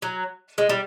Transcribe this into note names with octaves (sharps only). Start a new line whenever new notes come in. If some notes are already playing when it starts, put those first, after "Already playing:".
F#3
G#3
G3